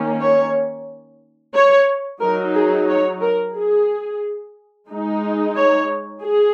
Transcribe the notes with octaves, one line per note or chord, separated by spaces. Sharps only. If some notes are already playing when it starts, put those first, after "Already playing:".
Already playing: D#3 A#3 C#4
C#5
C#5
F#3 D#4 A#4
G#4
C#5
A#4
G#4
G#3 D#4
C#5
G#4